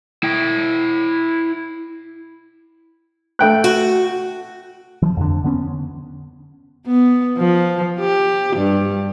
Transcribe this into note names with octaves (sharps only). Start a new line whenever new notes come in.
E4 G5
A3 G5 F#6
F#4
E3 F3
F2 D3
D3 B3 C#4
B3
F3
G4
G2